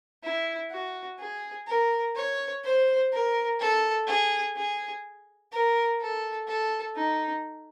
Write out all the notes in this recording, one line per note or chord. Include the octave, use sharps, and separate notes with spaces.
E4
F#4
G#4
A#4
C#5
C5
A#4
A4
G#4
G#4
A#4
A4
A4
D#4